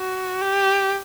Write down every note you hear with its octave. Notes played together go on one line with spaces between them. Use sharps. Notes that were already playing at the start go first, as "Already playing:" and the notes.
Already playing: F#4
G4